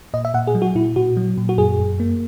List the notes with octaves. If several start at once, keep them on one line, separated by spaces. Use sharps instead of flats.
A#2 D#5
E5
A#2 F#5
G#4
F#3
F#4
A#2 E4
A#2 F#4
F#3
A#2
F#4
F#2 G#4
F#2
A#3